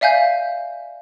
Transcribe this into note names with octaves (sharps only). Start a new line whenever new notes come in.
D5 E5 F5 G#5 G6